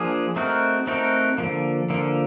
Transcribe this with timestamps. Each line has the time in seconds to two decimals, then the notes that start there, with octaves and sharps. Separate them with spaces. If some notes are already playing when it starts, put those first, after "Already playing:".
Already playing: F3 A#3 D4 F4 G#4
0.36 A3 C4 D#4 F#4 A#4
0.87 A3 C4 D#4 F#4 A#4
1.38 D3 F3 A#3
1.90 D3 F3 A#3